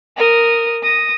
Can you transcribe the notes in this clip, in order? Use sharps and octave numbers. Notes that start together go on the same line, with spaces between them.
A#4 D#6
D#6 A#6